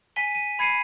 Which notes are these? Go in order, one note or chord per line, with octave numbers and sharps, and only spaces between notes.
G#5 B6 D#7 G7
D#7
B5 G#6 C7 C#7 D#7